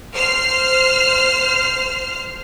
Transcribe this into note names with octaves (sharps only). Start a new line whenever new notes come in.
C5 F6 C7